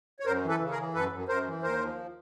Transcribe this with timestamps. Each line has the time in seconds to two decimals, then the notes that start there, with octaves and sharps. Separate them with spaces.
0.20 C#5
0.26 F#2 A#4 C5
0.43 E3
0.49 A4 B4
0.60 C#3
0.71 G#4 A#4
0.77 E3
0.94 F#2 A4 B4
1.12 F#2
1.28 F#2 A#4 C5
1.46 E3
1.63 D#2 A#4 C5
1.80 F3